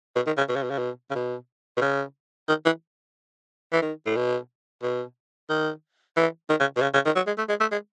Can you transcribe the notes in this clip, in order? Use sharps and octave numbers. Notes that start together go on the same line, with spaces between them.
B2
D#3
C#3
B2
C#3
B2
C#3
B2
C#3
B2
B2
C#3
D#3
E3
E3
D#3
A2
B2
B2
D#3
E3
D#3
C#3
B2
C#3
C#3
D#3
F#3
G#3
A3
G#3
A3
G#3